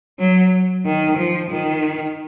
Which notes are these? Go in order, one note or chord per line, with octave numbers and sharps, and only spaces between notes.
F#3
D#3
F3
D#3